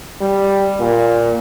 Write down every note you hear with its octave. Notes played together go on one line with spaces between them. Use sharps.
G3
A#2